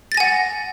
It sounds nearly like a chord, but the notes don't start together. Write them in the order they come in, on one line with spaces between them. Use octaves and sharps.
A6 A#6 G#5 F#5